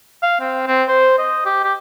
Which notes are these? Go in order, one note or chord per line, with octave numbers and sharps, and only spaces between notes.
F5
C4
C4
C5
D#5
G4
G4